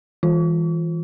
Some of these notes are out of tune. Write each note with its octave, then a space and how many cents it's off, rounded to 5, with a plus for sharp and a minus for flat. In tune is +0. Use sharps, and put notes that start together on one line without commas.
E3 -10 F4 +15